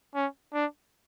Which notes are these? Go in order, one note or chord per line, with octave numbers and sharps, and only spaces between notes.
C#4
D4